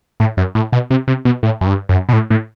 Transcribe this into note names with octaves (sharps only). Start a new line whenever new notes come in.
A2
F#2
A2
B2
C3
C3
B2
A2
F#2
G2
F#2
B2
A2
A2